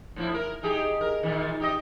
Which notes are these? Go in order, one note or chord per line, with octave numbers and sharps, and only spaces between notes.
A2 F3 E4
A#4
D#4 G4 G#4
A#4
A#2 D#3
D#4 G4 D#5